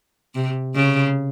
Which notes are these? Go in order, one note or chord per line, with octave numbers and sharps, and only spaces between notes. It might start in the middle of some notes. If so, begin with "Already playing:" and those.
C3
C#3